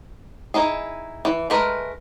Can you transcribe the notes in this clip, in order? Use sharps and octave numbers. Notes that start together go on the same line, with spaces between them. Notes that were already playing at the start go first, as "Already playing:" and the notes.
D#4 E4 G#4
E3
G#3 A3 A#4 B4